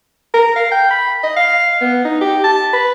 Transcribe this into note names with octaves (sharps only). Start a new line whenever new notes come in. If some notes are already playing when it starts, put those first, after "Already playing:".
A#4
F5
G5
B5
D#5
F5
B3
D#4
G4
A5
B4